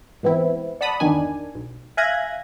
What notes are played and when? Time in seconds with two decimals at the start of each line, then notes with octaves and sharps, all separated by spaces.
0.23 G#2 E3 B3 C4 E4
0.81 D5 F#5 A5 B5 D#6
1.00 G1 E2 D#3 D4 G#5
1.55 B1
1.97 E5 F5 G#5 F#6 G#6 A#6